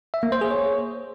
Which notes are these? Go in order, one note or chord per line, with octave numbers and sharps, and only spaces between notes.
E5
A#3
C5
G#4
C#5